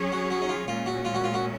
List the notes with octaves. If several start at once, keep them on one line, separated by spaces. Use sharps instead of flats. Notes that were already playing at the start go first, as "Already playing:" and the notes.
Already playing: F#3 C#4 G#4 C#5
F#4
F#4
D#4
F4
A#2 G#3 C#4 F4
F#4
F4
F#4
F4
F#4